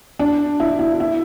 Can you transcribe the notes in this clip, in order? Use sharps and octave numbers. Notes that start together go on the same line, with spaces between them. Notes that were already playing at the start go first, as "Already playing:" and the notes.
D4
E4
E4
E4